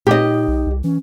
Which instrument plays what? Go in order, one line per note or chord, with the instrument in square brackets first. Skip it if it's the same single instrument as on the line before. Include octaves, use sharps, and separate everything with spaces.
[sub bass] A#2 [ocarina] D#4 [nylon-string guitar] G4 D#5
[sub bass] B1
C2
[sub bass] E3 [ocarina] C#4